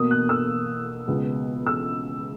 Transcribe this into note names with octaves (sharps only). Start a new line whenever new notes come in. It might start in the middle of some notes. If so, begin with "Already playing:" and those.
Already playing: B2 A#3 D#6
F#6
E6
C#2 B2 G#3 B3
E6